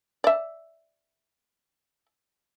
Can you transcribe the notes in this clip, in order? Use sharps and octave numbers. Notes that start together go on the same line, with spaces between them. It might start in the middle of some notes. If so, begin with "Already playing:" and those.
D5 E5